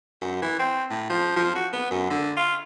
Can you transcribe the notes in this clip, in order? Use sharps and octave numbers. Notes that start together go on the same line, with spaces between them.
F#2
E3
C4
A2
F3
F3
F#4
B3
F#2
D3
F4